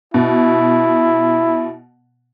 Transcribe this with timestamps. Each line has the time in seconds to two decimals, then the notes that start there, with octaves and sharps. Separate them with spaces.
0.14 B2 E4